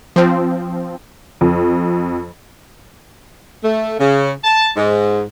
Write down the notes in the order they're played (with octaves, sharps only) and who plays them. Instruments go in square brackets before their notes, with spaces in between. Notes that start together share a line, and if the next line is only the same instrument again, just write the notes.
[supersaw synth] F3 C4
[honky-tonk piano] F2
[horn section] A3
C#3
A5
G#2